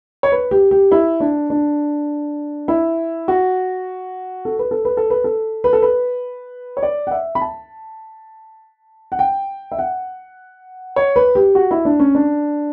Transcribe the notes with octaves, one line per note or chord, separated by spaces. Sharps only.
C#5
B4
G4
G4
E4
D4
D4
E4
F#4
A4
B4
A4
B4
A4
B4
A4
B4
A4
B4
C#5
D5
F#5
E5
B5
A5
F#5
G5
E5
F#5
C#5
B4
G4
F#4
E4
D4
C#4
D4